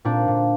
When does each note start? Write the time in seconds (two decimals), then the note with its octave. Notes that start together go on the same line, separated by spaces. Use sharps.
0.05 A#2 C4 D4
0.28 A#2